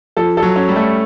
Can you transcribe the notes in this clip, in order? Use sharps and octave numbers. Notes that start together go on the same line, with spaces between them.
F3 A4
A4
F#3
C#4
G3
A3